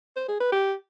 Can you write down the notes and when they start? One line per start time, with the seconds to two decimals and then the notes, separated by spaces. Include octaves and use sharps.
0.16 C5
0.28 G#4
0.40 B4
0.52 G4